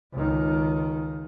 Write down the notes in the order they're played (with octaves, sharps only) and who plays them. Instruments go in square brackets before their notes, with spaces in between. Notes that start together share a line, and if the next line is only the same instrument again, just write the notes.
[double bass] C#2 D#3